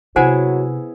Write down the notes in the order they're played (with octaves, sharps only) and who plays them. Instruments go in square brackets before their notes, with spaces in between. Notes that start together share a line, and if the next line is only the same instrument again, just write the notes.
[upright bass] C3 [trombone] F#3 [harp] B3 E4 G#4 [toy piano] C5 F#5 G#5